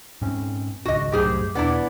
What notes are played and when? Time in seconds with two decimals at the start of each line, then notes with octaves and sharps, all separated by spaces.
0.21 G#2 C4 C#4
0.85 G#1 C#2 F#4 D#5
1.12 C2 F#2 A2 G4 G#4 C5
1.55 E1 B3 D4 E4